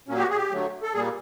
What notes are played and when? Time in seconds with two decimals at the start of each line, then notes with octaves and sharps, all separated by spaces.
0.08 A#2 F#3 A#3 C#4
0.18 G4
0.22 F#4
0.30 G#4
0.36 G4
0.51 D3 F#3 A3
0.83 A4
0.94 A#2 G3 A#3 G#4